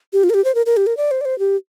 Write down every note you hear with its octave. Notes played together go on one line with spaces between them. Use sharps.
G4
F4
A#4
G4
C5
A#4
A#4
G4
A#4
D5
C5
D5
C5
G4